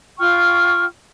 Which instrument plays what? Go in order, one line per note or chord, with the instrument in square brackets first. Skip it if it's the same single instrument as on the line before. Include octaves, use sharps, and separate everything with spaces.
[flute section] F4 G5 C#6 F6